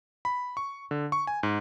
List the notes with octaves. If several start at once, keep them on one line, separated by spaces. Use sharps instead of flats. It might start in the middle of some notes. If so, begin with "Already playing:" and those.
B5
C#6
D3
C#6
G#5
G#2